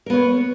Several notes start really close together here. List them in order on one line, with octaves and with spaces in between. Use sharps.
A#4 B3 C#5